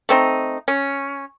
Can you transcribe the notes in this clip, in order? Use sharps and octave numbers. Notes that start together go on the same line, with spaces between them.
A3 C4 D#4
C#4